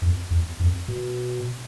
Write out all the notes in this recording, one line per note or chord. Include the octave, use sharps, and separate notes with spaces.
F2
E2
F2
B2